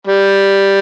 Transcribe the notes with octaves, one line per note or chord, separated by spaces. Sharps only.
G3